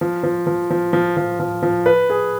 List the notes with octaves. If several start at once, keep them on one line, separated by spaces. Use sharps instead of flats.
F3
F3
F3
F3
F3
F3
F3
F3
B4
G#4